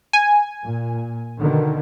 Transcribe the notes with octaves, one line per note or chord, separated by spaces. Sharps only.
G#5
A#2
B2 D3 D#3